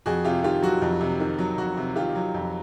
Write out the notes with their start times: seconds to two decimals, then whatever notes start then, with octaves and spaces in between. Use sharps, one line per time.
0.06 F2 F#4 G#4
0.24 C3 F4 G4
0.44 D#3 F4 G4
0.63 F#3 F#4
0.82 F2
1.01 C3
1.20 D#3
1.39 F#3
1.58 F2 F#4
1.77 C3
1.96 D#3 F4 G4
2.15 F#3
2.34 F2